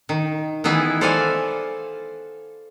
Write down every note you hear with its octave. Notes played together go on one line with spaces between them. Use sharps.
D#3
D#3 E3 B3 E4 G#4
A4 C5 D5 F5 F#5 G#5